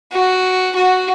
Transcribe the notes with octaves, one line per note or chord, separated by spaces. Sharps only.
F#4
F#4